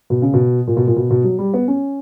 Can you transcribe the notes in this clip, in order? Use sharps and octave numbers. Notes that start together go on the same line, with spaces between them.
B2
C#3
B2
A#2
B2
A#2
B2
B2
F#3
G3
B3
C#4